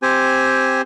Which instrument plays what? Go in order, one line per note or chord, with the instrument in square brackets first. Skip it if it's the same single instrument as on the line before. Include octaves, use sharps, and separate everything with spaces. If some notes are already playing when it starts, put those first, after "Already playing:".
[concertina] C4 G4 C5 G#5